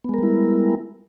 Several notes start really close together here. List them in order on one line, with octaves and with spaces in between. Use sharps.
B3 G#3 A#4 G3 E4